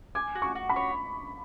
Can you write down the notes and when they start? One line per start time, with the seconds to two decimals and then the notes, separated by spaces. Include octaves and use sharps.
0.15 G#5 D6
0.35 F#4
0.42 C#6
0.55 F#4
0.69 B5
0.76 C#5